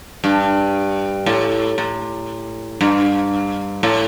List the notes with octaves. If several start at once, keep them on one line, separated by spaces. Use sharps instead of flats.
G2
A2
A2
G2
A2